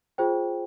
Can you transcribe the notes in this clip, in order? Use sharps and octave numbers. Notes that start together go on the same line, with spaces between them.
F4 G#4 C5 G5